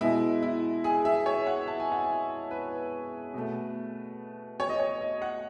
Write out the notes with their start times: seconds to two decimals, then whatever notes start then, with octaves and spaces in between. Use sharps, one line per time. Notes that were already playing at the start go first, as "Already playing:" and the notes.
0.01 B2 G#3 B3 E4
0.43 E4
0.84 G#4
1.05 E5
1.26 C#5
1.47 F#5
1.67 A5
1.80 G#5
1.92 F#5
2.04 G#5
2.51 B4
3.34 B2 A3
4.60 C#5
4.69 D#5
4.80 C#5
5.01 D#5
5.22 F#5